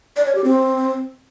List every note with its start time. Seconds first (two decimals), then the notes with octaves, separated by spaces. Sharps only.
0.17 D5
0.26 C#5
0.35 G4
0.44 C4